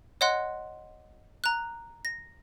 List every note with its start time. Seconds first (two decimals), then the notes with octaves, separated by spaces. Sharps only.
0.21 C#5 D#5 F#5 C6 F#6
1.44 A#5 F#6
2.05 A#6